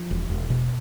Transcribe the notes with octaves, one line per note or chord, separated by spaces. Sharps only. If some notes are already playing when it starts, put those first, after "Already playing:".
Already playing: F3
E1
E1
B2